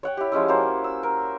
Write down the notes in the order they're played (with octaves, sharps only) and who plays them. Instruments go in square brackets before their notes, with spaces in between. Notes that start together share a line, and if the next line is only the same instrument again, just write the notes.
[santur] C#5 F#5 G5
E4 G4
F3 G#3 C#4 E4
A#3 C#4 F#4 C5
E6
A#4